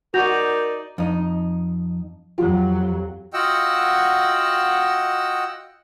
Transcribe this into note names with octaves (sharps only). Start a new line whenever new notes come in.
D#4 F#4 A#4 D5 G6 A#6 F7
F2 D#4
F2 F#3 F4 G4
F4 F#4 D#5 F#5 G5 E6